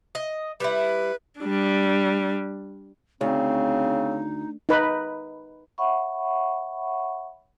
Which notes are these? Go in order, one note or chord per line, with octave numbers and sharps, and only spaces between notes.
D#5
G3 E4 B4
G3 D4
D2 C#3 C4 D#4
D#4 B4
C#5 E5 F#5 B5 C#6